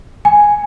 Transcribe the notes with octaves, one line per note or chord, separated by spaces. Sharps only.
G#5